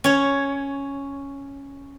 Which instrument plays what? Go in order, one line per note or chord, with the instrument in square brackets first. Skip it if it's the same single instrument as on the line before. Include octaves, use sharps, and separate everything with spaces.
[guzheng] C#4 C#5